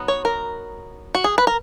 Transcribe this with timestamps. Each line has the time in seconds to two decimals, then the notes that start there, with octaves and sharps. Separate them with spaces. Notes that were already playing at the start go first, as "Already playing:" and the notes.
Already playing: F#3 B3 D#4
0.08 C#5
0.25 A#4
1.15 F#4
1.24 G#4
1.38 B4
1.47 A#4